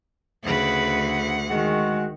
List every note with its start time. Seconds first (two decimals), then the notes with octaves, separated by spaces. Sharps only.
0.45 D2 C#3 B4 F#5
1.49 D#3 G#3 F#4